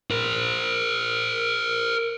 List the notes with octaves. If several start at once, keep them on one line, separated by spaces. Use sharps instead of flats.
A#4 C5